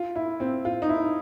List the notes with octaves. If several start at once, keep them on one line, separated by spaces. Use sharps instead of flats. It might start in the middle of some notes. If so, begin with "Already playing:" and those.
Already playing: F4
E4
C4
F4
D#4
E4